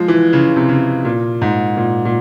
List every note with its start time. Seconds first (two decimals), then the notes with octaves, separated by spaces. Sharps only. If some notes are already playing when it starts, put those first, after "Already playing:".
Already playing: F3 G#3
0.08 E3
0.33 C#3
0.56 C3
0.69 C#3
1.05 A#2
1.42 G#2
1.77 A#2
2.05 A#2